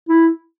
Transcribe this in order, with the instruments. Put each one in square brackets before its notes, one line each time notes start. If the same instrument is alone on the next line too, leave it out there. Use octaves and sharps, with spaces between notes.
[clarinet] E4